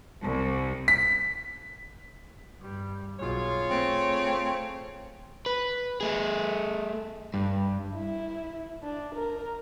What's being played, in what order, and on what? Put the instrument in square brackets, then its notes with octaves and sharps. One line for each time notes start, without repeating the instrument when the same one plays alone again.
[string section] C2
[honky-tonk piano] B6
[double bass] G2 G3
[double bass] B1 [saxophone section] F4 G#4 C#5
[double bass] A3 [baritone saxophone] C4
[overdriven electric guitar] B4
A3 G#4
G2
[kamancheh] E4
D4
A#4